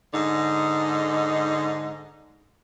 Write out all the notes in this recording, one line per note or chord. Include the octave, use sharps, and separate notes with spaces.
G#2 D3 D#4